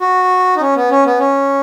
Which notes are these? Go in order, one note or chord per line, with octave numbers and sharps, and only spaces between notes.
F#4
D#4
C#4
B3
C#4
B3
C#4